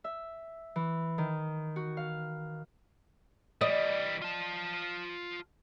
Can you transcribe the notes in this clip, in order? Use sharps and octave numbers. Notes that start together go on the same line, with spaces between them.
E5
E3
D#3
F#4
F5
E3 G3 D5 D#5
F4 A5